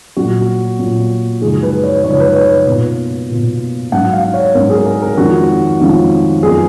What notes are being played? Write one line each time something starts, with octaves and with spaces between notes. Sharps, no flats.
A#2 F#3 C#4 F#4
A#2 F#3 C#4
F#2 C#3 F3 G#3 D#4 G#4
B4
C#5
F#2 C#3 F3 G#3 D#4 C#5
B4
C#5
B4
B2 A#3 F4
B2 A#3 F4
G#2 F#3 C#4 F#5
F5
C#5
G#2 F#3 C#4 A#4
G#4
A#4
A#4
F2 D#3 G#3 C#4 F4 F#4
F2 D#3 G#3 C#4 F4
F#2 F3 B3 D#4 G#4